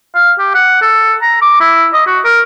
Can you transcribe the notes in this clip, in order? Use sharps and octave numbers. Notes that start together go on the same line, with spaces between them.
F5
G4
F#5
A4
A#5
D6
E4
D#5
F#4
A#4